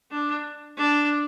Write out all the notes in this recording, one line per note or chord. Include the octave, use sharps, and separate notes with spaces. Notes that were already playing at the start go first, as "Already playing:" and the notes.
D4
D4